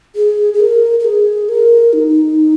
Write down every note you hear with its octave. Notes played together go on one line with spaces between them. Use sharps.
G#4
G#4
A#4
A#4
G#4
A#4
D#4